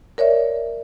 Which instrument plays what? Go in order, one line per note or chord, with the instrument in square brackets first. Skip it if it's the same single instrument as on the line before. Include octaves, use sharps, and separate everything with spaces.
[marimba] A#4 C#5 D5 E5